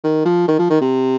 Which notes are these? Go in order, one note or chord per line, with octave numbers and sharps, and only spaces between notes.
D#3
F3
D#3
F3
D#3
C3